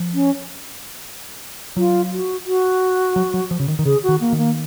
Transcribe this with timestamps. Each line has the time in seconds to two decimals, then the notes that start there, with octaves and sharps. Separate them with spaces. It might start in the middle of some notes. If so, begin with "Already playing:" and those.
Already playing: F3
0.14 C#4
1.77 F#3 F4
2.12 F#4
2.47 F#4
3.16 F#3
3.34 F#3
3.51 F3
3.60 C#3
3.68 D#3
3.79 D#3
3.85 C#3 G#4
4.03 F#4
4.09 D#3
4.21 A#3
4.33 D#3
4.38 A#3